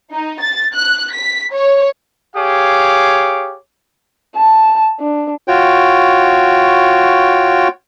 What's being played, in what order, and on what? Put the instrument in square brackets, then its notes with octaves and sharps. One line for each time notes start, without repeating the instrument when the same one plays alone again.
[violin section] D#4
A6
F#6
B6
C#5
[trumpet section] G4 G#4 C#5 F5 D6
[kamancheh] A5
D4
[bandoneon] F4 F#4 C#5 G5